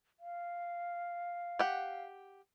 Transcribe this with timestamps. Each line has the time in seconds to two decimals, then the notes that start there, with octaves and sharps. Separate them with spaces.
0.20 F5
1.59 G4 F#5